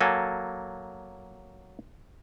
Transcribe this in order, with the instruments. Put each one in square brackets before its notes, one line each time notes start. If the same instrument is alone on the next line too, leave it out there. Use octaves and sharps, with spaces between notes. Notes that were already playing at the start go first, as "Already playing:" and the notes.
[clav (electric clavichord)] F#3 A#3 A4 G#5